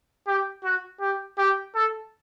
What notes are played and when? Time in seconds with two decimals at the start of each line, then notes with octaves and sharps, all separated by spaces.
0.27 G4
0.64 F#4
1.01 G4
1.38 G4
1.75 A4